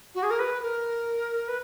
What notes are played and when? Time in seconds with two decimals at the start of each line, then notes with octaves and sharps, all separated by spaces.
0.15 F#4
0.23 G#4
0.30 A#4
0.39 B4
0.62 A#4
1.48 B4